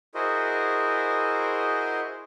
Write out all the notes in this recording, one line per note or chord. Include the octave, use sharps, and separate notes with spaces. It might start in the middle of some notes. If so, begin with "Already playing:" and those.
E4 F#4 G#4 A#4 C5 D#5